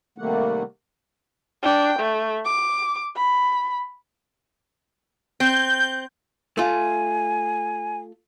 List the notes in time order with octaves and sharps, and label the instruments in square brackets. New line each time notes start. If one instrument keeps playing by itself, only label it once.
[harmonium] C3 D#3 G3 A3 A#3 F#5
[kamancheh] D4 G5
A3
D6
B5
[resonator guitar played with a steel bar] C4 [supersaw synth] G6
[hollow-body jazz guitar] A3 F4 [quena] G#5